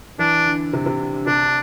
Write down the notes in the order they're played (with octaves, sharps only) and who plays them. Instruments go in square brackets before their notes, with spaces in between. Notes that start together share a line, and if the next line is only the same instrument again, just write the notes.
[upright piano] E3 [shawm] D4
[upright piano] D3
C3
C3
D3
D3
[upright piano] C3 [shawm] D4